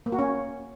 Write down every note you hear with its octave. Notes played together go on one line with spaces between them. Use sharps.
A#3
F#4
C#4